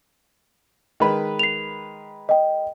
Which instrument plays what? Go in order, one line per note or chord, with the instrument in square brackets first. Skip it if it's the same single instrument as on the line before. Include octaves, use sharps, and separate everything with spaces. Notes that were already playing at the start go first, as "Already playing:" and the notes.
[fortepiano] D#3 G#3 B4
[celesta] C7 F7
D#5 G5